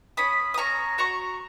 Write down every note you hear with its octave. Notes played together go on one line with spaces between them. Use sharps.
C#4 B5 D#6
D#6
C#4 A#5 C#6
F#4 A#5 C#6